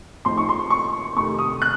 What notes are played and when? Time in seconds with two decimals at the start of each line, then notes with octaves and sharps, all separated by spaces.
0.25 A2 F3 C4 D#4 C6
0.37 C#6
0.49 C6
0.70 C#6
1.16 F2 C3 D#3 A3 C#6
1.39 D#6
1.62 F#6